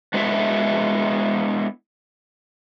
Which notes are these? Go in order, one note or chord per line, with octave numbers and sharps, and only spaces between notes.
G#3 B3 D4 E4 A4 E5